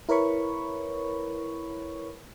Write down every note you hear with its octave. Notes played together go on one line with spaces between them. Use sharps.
E4 A#4 B4 C#5 B5 C#6